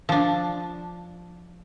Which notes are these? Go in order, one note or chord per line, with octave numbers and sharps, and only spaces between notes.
F3 D4